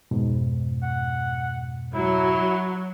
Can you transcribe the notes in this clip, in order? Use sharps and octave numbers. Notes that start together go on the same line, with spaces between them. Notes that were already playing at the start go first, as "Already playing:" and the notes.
F2 G#2 B2
F#5
F#3 E4